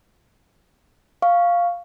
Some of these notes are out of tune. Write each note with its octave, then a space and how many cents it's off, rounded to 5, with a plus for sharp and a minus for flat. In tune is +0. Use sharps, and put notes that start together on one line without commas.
F5 +0 C#6 +5